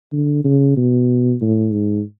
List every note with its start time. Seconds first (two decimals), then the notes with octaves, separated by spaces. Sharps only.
0.13 D3
0.44 C#3
0.77 B2
1.41 A2
1.73 G#2